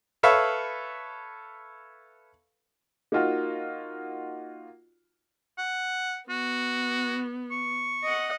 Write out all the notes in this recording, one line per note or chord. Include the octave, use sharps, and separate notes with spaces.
A4 B4 C#5 E5 F5 B5
A#3 D#4 F4 F#4
F#5
B3 F#4
C#6
D#5 F#5